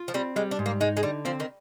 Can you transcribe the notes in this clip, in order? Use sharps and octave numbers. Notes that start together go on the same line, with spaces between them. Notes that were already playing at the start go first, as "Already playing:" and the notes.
Already playing: F4
F3
G3 C4
G3 G#3
D4
G#2
A#3
G#3 D#4
G#3
D3 G3
F3 C4
D#3